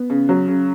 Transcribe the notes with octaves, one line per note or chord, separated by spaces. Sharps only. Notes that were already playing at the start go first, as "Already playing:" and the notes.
Already playing: B3
C#3
F#3
C#3